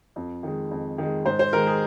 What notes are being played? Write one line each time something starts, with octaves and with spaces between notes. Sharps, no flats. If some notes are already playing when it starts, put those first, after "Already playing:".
F2
D#3 G#3
F2
D#3 G#3
G#2 C5
C5
D#3 G#3 A#4
G#4